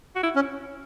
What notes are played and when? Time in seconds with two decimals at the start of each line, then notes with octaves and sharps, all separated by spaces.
0.16 F#4
0.23 E4
0.35 C#4